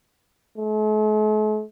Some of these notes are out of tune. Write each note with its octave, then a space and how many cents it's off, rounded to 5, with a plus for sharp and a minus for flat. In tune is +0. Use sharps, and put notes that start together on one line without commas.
A3 -45